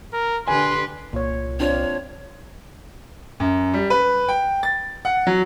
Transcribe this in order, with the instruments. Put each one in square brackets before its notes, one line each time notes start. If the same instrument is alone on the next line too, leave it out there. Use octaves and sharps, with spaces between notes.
[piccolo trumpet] A#4
[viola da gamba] D3 G4 B4 [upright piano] G#5 [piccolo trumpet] C6
[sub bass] C2 [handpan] A#2 C#5
[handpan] C4 D4 F4 [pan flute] C#5
[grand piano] F#2
G3
B4
G5
A6
F#5
F#3